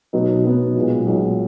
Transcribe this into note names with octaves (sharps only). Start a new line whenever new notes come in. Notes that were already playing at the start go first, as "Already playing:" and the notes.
B2 F#3 B3 D#4
B2 F#3 B3 D#4
B1 A#2 G#3
B1 A#2 G#3